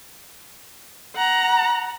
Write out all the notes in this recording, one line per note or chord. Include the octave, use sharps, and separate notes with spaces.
F#5 A#5